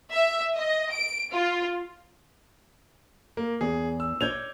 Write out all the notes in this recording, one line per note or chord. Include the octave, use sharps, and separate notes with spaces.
E5
D#5
D7
F4
A#3
E2 G#4
E6
C#5 D5 G6 G#6 F7